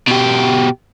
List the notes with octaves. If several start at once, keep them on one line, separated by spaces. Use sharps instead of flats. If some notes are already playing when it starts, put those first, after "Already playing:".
B2 G4